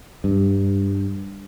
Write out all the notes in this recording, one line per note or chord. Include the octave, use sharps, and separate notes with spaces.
G2